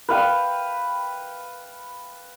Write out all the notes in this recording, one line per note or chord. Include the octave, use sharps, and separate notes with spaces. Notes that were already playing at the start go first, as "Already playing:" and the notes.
B4 F5 G5